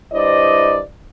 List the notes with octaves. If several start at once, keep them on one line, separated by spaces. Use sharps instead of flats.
G2 E4 C5 D5 D#5